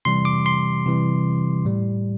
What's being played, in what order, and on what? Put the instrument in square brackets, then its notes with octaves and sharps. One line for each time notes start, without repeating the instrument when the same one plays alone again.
[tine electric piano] C3 E3 G3 C6
D6
C6
C3 E3 G3
A2 G3